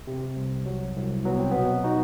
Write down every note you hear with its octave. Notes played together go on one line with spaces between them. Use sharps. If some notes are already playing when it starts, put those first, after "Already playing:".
C3
C2
F#3
C2
F#3 B3
C4
B2 B3
D#4 F#4